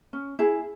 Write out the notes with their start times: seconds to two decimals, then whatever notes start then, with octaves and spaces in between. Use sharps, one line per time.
0.13 C#4
0.39 E4 G#4